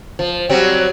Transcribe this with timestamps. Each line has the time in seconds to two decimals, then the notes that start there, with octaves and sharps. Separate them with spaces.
0.19 F3
0.49 F#3 G3 C4